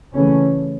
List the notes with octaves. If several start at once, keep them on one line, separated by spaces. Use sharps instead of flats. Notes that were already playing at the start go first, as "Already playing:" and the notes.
C#3 E3 A3 C#4